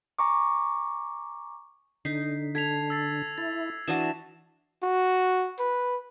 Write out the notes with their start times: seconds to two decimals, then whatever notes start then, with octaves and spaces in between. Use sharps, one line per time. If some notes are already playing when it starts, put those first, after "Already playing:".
0.19 G#5 A#5 C#6 D6
2.05 D3 D#4 B6 C7
2.55 A4 G#6 B6 F7
2.90 E6 A6 C7
3.38 E4 A6
3.88 E3 D4 F#4 D#6 E7
4.83 F#4
5.59 B4